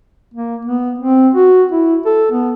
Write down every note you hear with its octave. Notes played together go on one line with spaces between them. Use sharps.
A#3
B3
C4
F#4
E4
A4
B3